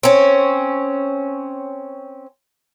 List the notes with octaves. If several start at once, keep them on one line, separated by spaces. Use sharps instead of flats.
C4 C#4